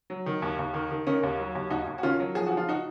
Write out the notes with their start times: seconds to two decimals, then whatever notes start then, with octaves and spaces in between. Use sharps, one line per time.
0.10 F#3
0.26 D#3
0.42 D#2
0.59 D#2
0.74 D#3
0.91 D#3
1.07 D#3 A#3 C#4
1.23 D#2
1.39 F#3
1.55 D#2
1.70 D#2 D#4 F#4
1.87 D#2
1.98 F#4
2.03 D#3 C#4 F4
2.20 F#3
2.35 F3 G#4
2.46 F3 F#4
2.57 F4
2.69 D#4 F#4